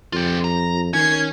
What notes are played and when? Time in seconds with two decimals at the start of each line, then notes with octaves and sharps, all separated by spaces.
0.13 F2 F4 G4
0.44 A#5
0.94 D#3 C#4 G#6 C7